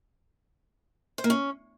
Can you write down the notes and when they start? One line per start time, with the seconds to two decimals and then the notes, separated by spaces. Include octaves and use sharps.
1.18 C5
1.24 A#3
1.30 C#4